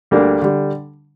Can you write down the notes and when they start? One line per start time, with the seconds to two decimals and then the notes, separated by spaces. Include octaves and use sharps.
0.11 D2 D3 G3 A#3 D4
0.42 D3 G3